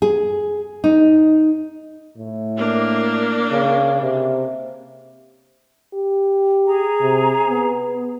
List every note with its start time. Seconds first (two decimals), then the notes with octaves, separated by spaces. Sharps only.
0.02 G#4
0.84 D#4
2.17 A2
2.57 A#3 D4
3.52 C#3
4.02 C3
5.94 G4
6.65 G#4 A#5
7.01 C3
7.47 B3